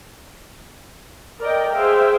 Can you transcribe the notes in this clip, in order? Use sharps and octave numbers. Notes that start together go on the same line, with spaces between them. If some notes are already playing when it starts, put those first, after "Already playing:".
A#4 D5 D#5 G5
G#4 C5 E5 F5 G5